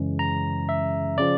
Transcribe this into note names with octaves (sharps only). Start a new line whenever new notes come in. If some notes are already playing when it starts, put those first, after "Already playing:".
Already playing: F#2 C#3 E3 G#3 C#4
A#5
E5
C#3 F3 D5